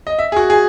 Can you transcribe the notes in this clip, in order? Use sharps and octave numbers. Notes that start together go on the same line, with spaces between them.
D#5
E5
G#4
F#4
G#4